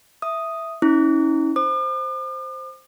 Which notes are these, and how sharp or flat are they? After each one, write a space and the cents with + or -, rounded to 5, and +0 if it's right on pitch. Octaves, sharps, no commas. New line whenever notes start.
E5 +0 D#6 +0
C#4 +0 E4 -40 D6 -45
C5 +0 D6 +45